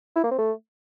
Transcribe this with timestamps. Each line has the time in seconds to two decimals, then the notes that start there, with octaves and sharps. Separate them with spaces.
0.16 E4
0.24 A#3
0.31 C4
0.39 A3